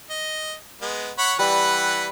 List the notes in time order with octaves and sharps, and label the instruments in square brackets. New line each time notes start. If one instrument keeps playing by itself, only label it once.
[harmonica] D#5
G#3 B3
C#5 F#5 B5
[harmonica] E3 B4 F#5 [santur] G3